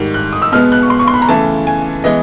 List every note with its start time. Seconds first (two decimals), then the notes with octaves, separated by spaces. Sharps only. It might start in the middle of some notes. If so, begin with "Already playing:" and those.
Already playing: G#2 D#3 G3
0.14 F#6
0.33 D#6
0.42 E6
0.52 B2 G#3 B3 F6
0.72 F#6
0.83 C#6
0.90 C6
0.99 C#6
1.07 C6
1.14 B5
1.22 A#5
1.29 C#3 E3 A3 A5
1.67 G#5
2.04 E3 G#3 B3 D#5